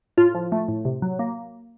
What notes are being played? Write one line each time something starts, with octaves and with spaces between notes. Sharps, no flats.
A2 F4
F3
A3
A2
C3
F#3
A#3